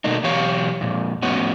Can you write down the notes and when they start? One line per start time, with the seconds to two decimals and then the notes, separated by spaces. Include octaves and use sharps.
0.04 B2 A3 A#3 D4 D#4
0.23 B2 E3 F#3 G4 C#5 F5
0.81 F2 A#2
1.23 F2 A2 B3 C#4 F#4